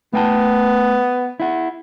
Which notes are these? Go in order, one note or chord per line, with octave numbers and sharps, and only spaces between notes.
A3 B3 G5 A5
E4 F#5